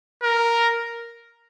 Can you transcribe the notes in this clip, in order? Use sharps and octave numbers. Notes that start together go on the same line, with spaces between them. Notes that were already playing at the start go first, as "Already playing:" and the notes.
A#4